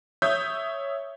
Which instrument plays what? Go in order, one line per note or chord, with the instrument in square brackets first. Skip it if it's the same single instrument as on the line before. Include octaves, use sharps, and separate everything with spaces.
[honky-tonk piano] C#5 E5 D#6 G6